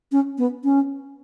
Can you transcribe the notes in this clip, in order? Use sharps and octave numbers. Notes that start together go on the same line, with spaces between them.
C#4
B3
C#4